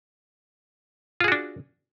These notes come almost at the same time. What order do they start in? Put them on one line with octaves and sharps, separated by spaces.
F4 G#4 F#4 D4